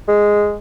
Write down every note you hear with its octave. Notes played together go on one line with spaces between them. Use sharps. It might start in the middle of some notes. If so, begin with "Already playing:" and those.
G#3